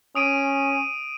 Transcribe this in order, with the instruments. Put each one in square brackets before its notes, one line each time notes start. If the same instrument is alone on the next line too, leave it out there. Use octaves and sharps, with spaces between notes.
[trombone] C#4 [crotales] D#6 D7 D#7